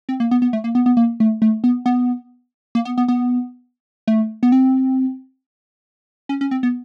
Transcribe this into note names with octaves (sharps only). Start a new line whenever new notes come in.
C4
A#3
B3
B3
A3
A#3
B3
B3
A#3
A3
A3
B3
B3
A#3
B3
B3
B3
A3
B3
C4
C#4
C#4
C4
B3